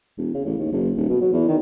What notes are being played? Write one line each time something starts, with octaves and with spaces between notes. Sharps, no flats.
E1
C#3
A1
D#2
F#1
D#1
B2
F#3
E2
D#3